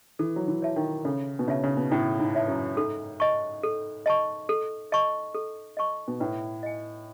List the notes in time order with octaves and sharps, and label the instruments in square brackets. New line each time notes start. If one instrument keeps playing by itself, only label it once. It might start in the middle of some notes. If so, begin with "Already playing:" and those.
[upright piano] E3 [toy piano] A4
[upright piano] F#3
E3
[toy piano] C#5 E5 A5
[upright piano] D#3
[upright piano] C#3 [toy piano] A4
[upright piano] B2
[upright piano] C#3 [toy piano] C#5 E5 A5
[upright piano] C#3
B2
[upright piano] A2 [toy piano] A4
[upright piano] G#2
[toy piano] C#5 E5 A5
[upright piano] F#2
[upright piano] G#2 [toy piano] A4
[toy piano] D#5 A5 C#6
A4
D#5 A5 C#6
A4
D#5 A5 C#6
A4
D#5 A5 C#6
[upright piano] B2
[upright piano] A2 [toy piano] B4
[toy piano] D#5 G#5